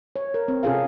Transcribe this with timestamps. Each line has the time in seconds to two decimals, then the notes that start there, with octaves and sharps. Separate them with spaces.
0.16 C#5
0.34 A#4
0.48 C4
0.63 C3 C#4 F4 G#4 A4 F5